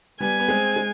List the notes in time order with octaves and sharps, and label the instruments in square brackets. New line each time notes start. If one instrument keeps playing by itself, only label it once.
[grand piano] G3 B3 [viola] G#5
[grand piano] B3
G#3 C4
G#3